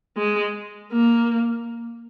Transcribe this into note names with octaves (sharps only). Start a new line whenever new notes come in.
G#3
A#3